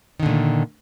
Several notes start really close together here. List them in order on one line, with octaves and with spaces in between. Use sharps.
D#3 D3 A#2 A3